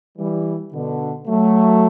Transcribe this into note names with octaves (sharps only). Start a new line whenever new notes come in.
E3 G3
B2 D3
F#3 A3